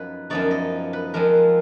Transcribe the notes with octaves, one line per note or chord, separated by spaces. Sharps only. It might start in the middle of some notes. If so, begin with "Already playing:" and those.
Already playing: F#2 F3 B3 D#4 B4
F#2 F3 B3 D#4 D5
D#5
B4
F2 F3 G#3 A#4